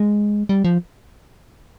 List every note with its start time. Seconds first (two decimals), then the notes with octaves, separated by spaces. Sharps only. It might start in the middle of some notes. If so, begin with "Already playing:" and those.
Already playing: G#3
0.49 G3
0.64 F3